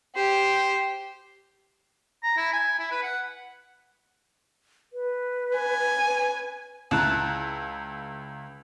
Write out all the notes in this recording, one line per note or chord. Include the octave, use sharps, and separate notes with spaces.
G4 C5
A#5
E4
G#5
E4
B4
F#5
B4
G#5
B4
C#2 E4 A5 A#5 F#6